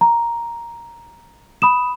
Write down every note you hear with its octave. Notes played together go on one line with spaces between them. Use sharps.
A#5
B5 D#6 E7